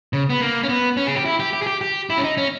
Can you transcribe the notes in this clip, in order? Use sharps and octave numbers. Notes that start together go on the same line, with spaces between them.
C#3
B3
A#3
C#4
B3
C#4
G#4
G4
E4
G4
G4
G#4
G4
G4
E4
C#4
D#4
C#4